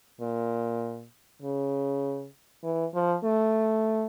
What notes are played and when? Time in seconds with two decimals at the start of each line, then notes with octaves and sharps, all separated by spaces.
0.21 A#2
1.42 C#3
2.63 E3
2.95 F3
3.24 A3